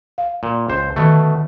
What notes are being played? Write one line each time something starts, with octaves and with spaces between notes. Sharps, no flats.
F5
A#2
C#2 C5
B2 D3 D#3 A3